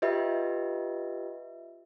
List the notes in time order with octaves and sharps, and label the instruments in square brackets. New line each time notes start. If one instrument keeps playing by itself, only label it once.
[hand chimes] F4 G4 B4 D#5 E5